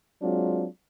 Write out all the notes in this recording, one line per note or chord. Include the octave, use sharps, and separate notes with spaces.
F#3 G#3 C4 D4 F4